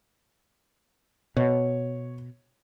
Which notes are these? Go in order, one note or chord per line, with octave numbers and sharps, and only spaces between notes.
B2 C#5